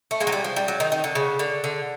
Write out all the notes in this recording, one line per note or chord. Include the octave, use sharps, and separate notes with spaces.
A3
G#3 A#3
F#3
G3
F3
G3
F#3
D#3
D#3
D3
C#3
D3
D3